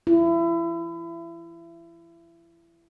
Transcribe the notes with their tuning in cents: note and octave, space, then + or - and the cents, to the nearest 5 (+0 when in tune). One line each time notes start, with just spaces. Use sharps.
E4 +30